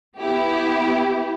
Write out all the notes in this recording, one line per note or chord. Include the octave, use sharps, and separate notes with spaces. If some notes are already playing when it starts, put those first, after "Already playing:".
B3 E4 G4